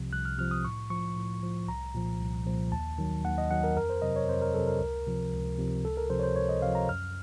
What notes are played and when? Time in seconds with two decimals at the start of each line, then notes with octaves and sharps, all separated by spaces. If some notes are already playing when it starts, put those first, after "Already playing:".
Already playing: C2 C3 F3
0.12 C2 F#6
0.25 F6
0.38 C3 F3 F6
0.51 D#6
0.64 A2 C#6
0.90 F3 C#6
1.17 A2
1.43 F3
1.68 C2 A#5
1.94 A#2 F3
2.21 C2
2.46 A#2 F3
2.72 D#2 A5
2.98 D#3 F#3
3.25 D#2 F#5
3.38 D#5
3.51 D#3 F#3 F#5
3.64 A#4
3.76 F2 A#4
3.90 C5
4.02 C3 F#3 D#5
4.16 C#5
4.29 F2 C5
4.42 A#4
4.54 C3 F#3 A4
4.67 A#4
4.80 C#2
5.07 C3 F3
5.32 C#2
5.58 C3 F3
5.84 C#2 A4
5.97 A#4
6.10 C3 F3 C5
6.19 C#5
6.23 C5
6.36 C#2 C#5
6.49 D#5
6.62 C3 F5
6.67 F3
6.75 A#5
6.89 F#2 F6